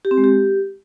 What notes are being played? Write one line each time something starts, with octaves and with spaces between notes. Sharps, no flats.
G4
C4
G#3
G4